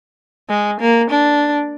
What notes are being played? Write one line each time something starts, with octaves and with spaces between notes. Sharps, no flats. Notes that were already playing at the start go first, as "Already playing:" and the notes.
G#3
A#3
D4